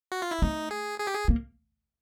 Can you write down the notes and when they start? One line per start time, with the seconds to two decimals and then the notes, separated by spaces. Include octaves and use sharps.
0.12 F#4
0.22 F4
0.31 E4
0.42 A3 D#4
0.71 G#4
1.00 G#4
1.07 G4
1.14 G#4
1.28 A#3